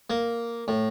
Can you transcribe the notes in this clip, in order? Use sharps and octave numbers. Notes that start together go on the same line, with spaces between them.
A#3
A2